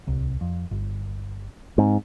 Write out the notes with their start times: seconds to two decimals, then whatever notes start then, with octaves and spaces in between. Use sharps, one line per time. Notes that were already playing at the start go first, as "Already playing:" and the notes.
0.07 D1 C2
0.41 F2
0.71 G1
1.78 G#2 C4